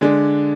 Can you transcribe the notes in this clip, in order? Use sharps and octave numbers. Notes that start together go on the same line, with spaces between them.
D3 G#3 D4